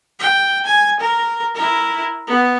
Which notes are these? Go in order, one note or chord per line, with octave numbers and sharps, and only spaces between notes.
G5
G#5
A#4
E4 A#4
B3